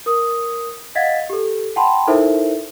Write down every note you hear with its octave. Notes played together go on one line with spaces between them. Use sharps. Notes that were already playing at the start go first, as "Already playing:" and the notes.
A#4 D#6
D#5 F5 F#5 G#6 A6 B6
G4 A4
F#5 G5 A5 B5 C6
D#4 E4 A4 A#4 C5 E5